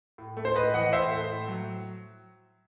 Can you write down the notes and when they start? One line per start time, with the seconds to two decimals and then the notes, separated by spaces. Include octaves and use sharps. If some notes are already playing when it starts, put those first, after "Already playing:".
0.18 A2
0.37 A3
0.45 C5
0.55 A2 B4 D#5
0.74 E3 D#5 F#5
0.92 A2 C5 E5
1.11 A3
1.30 A2
1.48 F#3